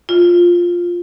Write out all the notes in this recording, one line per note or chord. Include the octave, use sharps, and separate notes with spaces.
F4